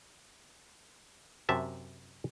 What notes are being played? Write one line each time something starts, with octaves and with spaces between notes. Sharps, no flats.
F#2 C3 E5 A5